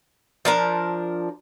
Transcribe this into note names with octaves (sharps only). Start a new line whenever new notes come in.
F3 D4 A#4